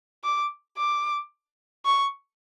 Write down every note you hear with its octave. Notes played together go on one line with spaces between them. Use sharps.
D6
D6
C#6